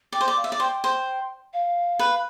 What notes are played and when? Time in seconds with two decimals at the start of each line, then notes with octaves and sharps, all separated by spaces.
0.12 D5 G5
0.21 C5
0.28 D5
0.37 F5
0.44 E5
0.52 D5
0.60 C5 G5
0.84 C5
1.53 F5
1.99 B4